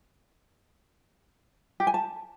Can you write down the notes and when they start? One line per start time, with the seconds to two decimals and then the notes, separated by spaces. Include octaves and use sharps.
1.80 G4
1.87 G#5
1.94 A5